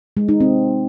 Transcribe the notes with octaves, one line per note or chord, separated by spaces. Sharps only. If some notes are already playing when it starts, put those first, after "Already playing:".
G#3
D#4
C4